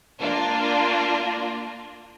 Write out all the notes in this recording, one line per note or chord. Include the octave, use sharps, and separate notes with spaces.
A#3 D4 F4